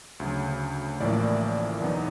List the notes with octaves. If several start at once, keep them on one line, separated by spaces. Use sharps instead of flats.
D2 C#3 F#3
A1 A2 F3 A#3 D5
E2 B2 F#3 B3 D#4